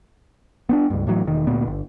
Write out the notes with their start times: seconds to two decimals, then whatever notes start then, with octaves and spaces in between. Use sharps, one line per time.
0.69 B3 C4 D4
0.90 C#2 G2
1.07 A2 E3 F#3
1.25 E1 D#3
1.47 D2 A#2 B3
1.67 G1